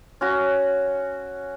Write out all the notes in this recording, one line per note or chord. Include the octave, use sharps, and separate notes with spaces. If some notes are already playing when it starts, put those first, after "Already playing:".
C#4 F#4